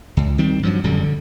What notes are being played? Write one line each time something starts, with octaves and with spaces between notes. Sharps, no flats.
C#2
D#3 G3 C4
G2 F3 F#3
D1 F#2 D3 G3
D3